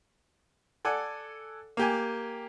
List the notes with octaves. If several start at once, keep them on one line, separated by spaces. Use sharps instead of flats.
A4 D5 F#5 G#5
A#3 G4 G#5